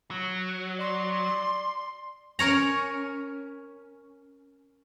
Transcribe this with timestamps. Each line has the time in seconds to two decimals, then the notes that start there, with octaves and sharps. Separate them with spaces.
0.11 F#3
0.80 D5 C6
2.39 C#4 A#4 C#5 A#5